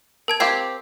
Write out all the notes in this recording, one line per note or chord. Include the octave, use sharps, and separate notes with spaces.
A#4 A5 G#6
C4 G4 F5 G#6 C7